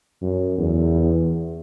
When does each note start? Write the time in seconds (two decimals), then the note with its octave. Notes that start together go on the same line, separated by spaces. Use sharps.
0.22 F#2
0.58 E2